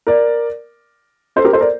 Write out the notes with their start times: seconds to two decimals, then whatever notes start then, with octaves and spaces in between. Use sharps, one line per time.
0.07 A#4 D5
1.36 A4 C5
1.44 G4 A#4
1.53 A4 C5
1.61 A#4 D5